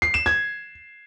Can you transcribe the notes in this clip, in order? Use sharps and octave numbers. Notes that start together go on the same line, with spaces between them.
C7
E7
G#6